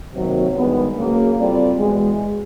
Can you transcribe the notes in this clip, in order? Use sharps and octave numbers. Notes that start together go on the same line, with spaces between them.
C3 D#3 F#3 A#3
G2 D#3 G#3 B3
C#3 F#3 A#3
G3 C4 F4 A4 D5
E2 B2 G#3